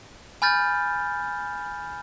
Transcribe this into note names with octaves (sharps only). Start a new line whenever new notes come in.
G#5 B5 F6 G6 A6